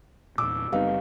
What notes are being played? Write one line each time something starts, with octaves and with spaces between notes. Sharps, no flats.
E2 A#2 D6 E6
F#1 G3 B3 C4 D#4 G4 F5